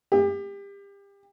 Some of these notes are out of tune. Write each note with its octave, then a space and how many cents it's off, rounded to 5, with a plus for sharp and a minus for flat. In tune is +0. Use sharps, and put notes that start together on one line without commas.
G4 +30